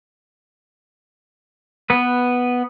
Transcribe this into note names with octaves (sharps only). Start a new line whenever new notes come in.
B3 B4